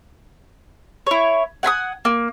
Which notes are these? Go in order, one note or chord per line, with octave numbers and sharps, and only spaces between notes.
E4 C#5
F#5 G#5 B5 D#6
A#3